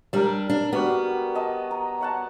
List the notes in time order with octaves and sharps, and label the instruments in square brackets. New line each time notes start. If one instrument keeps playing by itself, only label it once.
[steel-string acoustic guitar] G3 D4 [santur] A#4 E6
[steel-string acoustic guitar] D4
[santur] G3 F#4 [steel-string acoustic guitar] B3
[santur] D#5 A5
A#5
C#5 F#5 A5